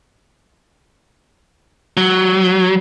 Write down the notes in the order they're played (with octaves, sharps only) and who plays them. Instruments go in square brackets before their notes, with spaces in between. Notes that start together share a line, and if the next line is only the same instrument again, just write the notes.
[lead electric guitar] F#3